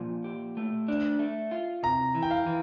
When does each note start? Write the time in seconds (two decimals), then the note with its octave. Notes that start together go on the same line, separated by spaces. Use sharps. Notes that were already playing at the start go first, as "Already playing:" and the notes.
Already playing: A#2 F3
0.24 G4
0.57 A3
0.88 D4
1.19 A3
1.51 F4
1.83 C3 A#5
2.15 E3
2.23 G5
2.31 F5
2.46 E3